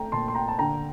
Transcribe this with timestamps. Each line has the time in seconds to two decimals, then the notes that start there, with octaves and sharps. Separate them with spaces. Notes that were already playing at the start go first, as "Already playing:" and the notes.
Already playing: A3 G5 A#5
0.12 A#2 A5 C6
0.28 C6
0.35 G5 A#5
0.48 A5
0.58 D3 G5 A#5